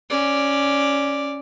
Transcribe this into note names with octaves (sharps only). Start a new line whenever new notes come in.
C#4 D5